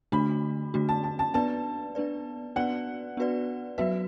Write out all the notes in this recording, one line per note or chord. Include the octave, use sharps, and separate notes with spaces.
D3 A3 D4 F#4 B5
D3 A3 D4 F#4
A5
A5
A5
B3 D4 B4 D5 A5
B3 D4 B4 D5
B3 D4 F#4 B4 D5 F#5
B3 D4 F#4 B4 D5
F#3 B3 F#4 B4 E5